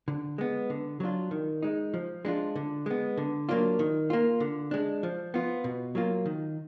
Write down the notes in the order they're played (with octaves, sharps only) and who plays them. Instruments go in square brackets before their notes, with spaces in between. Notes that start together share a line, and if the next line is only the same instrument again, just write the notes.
[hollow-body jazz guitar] D3
G#3 B3
D3
F#3 D4 F4
D#3
G#3 D#4
F3
G#3 D4 F4
D3
G#3 B3
D3
F#3 A#3 D4 F4
D#3
A#3 F4
D3
G#3 D4
F3
B3 F4
B2
F#3 A#3 F4
D#3